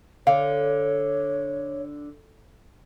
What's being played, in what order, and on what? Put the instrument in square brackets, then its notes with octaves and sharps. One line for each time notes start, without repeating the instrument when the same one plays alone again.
[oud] D3 [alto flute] C#5 [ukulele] F5